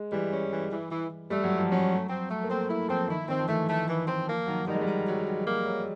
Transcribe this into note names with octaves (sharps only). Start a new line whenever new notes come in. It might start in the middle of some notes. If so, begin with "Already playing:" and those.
Already playing: G#3
E3 G3
C#4
E3
E3
E3
E3
G3 A3
F#3
E3
F3
F#3 C#4
A3
C4
A3
A#3
A3 C4
A#3 E4
F3 C4
D#3 E4
D#3 C4
F3
E3 A3
A3
E3
C4
F3 A#3
D#3 F#3
D#3 G3
G#3
G3
D#3
F#3
D#3
A#3
F#3